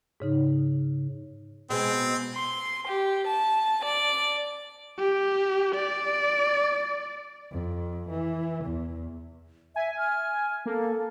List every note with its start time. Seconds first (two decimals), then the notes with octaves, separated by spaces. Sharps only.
0.20 G#2 C#3 D#4
1.70 B2 G#3 B3 C4
2.34 C6
2.87 G4
3.27 A5
3.84 D5
4.99 G4
5.75 D5
7.52 F2
8.10 E3
8.65 E2
9.76 E5 G#5
9.98 F6
10.66 A#3 A4